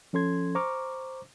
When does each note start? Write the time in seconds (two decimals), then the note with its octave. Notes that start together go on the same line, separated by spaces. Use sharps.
0.13 F3 C#4 A4 C6 G#6
0.55 C5 A#5 C#6 D6 F6